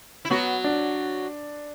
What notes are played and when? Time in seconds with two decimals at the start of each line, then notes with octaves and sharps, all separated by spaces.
0.25 E4
0.30 F#3 B3 F#4
0.64 D4